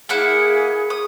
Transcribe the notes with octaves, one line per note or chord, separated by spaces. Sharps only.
A#3 E4 G#4 F#5
D#6